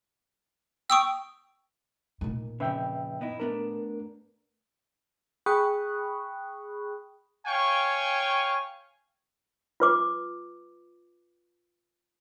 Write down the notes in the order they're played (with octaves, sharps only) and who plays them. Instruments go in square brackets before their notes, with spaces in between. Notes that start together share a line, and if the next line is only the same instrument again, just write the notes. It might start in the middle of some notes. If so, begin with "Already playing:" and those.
[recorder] G5 [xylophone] C#6 D#6 E6
[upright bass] A#2 D#3
[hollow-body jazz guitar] F2 C#3 [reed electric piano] B4 E5 G5
[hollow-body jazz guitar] B3 D#4 E4
[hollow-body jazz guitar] A3 B3 D4 [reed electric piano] A#4
[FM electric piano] G#4 G5 B5 C#6 D#6 F#6
[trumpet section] C#5 F5 G5 G#5 C#6
[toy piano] F4 B4 D6